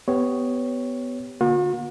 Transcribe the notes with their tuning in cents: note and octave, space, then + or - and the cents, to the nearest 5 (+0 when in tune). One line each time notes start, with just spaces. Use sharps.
B3 +15 G4 +0 C#5 +0
D3 +0 A#3 +35 F#4 -45